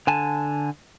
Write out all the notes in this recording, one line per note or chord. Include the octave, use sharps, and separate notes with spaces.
D3 G#5 A5